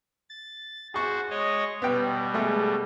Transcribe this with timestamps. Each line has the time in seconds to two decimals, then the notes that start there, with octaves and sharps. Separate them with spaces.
0.29 A6
0.94 F#4 G#4 C5 C#6
1.30 G#3 C#5 D#5
1.82 B2 G3 B3 G5
2.34 G#3 A3 G#4